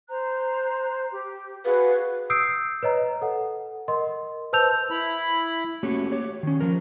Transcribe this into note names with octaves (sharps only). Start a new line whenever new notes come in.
C5 A#5 F#6
G4
F#4 G#4 B4 F5
D#6 E6 G6 C7 D7
B4 C#5 D#5 A#5
A4 F#5
A#4 D#5 C6
B4 C5 A5 E6 G6 F7
E4 B5
A3 A#3 C#4 F#4 G4
G4 C#5
D#3 C#4
F3 A#4